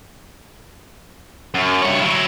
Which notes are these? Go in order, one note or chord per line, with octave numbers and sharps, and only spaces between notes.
F#2
G2 C#5
F#3 E4